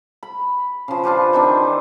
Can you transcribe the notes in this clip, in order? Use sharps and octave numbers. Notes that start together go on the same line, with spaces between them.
B5
C#3 F3
D4 F4 G4 B4
D#3 E3 C4 D4